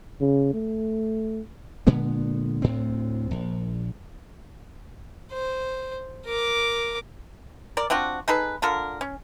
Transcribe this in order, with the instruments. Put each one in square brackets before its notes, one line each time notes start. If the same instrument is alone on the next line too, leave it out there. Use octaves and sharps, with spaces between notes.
[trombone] C#3
A3
[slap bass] A#2 D3 G#3 B3
D2 A2 C4
A#1
[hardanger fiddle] C5
A#4 D6
[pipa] A#4 D5
C4 D4 F4 F#4
D#4 G#4 A4 B4
D3 F4 A4 A#4
C#4